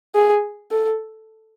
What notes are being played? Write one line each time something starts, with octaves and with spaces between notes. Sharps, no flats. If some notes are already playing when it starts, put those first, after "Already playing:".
G#4
A4